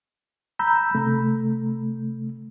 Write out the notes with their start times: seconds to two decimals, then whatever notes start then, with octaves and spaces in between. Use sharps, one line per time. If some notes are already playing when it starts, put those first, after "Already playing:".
0.59 A#5 B5 E6 G6
0.95 C3 A3